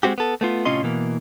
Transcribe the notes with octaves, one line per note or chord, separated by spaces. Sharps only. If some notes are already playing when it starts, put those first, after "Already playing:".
G#3 A3 C4 F#4 G4
B3 A4
A3 B3 F4
A2 C3 C#4 F4 D#5 C6
B2 E3 A#3